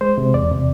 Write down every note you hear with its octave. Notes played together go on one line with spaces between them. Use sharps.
G#3 C5
C3
E2 D5
C3